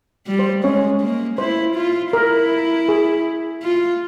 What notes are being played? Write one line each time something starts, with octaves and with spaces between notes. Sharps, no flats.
G3
C5
G#3 C#4 C#5
A#3
E4 C5
F4
E4 A#4
G#4
F4